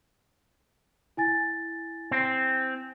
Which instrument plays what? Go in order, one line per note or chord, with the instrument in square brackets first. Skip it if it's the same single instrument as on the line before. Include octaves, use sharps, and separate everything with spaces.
[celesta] E4 G#5 A6
[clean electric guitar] C4